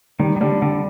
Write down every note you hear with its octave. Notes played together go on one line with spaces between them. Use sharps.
D#3 G3
D#3
D3 G3
D3 G3